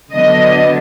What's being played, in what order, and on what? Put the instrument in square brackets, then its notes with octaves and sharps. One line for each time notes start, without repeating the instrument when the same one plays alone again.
[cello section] D3 F#3 B3 D4 D#5